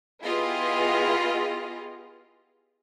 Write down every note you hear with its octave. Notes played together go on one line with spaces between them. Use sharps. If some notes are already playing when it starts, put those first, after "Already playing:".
B3 E4 F4 G4 G#4 D#5